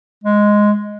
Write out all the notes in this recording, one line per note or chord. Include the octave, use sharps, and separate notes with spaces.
G#3